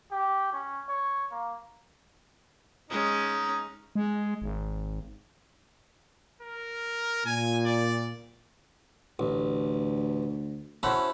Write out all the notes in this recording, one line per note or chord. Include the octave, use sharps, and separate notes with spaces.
G4
C#4
C#5
A#3
G#3 C#4 D#4
G#3
G#1
A#4
A#2 G#5
D5
A1 D2
C#4 E4 F#4 A4 C5 B5